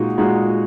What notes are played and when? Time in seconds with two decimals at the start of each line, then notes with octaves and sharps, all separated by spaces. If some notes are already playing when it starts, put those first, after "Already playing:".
Already playing: A#2 G#3 D#4 F#4
0.18 A#2 G#3 D#4 F#4